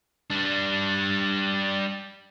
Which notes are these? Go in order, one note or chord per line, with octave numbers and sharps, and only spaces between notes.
G3 D4